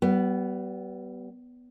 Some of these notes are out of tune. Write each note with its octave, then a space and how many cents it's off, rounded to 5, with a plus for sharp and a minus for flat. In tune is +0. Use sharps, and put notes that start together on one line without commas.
G3 -35 B3 +0